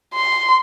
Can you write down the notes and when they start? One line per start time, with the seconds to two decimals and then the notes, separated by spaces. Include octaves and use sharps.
0.14 C6